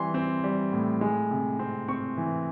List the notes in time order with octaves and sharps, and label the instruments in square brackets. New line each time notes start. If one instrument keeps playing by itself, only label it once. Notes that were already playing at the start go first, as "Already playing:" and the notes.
Already playing: [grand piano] E3 G3 C4 C6
C4
G3
A2
G#3
C3
C4
C4 C#6
E3